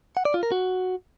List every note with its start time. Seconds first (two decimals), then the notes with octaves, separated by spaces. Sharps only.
0.17 F#5
0.25 D5
0.34 F4
0.43 A#4
0.52 F#4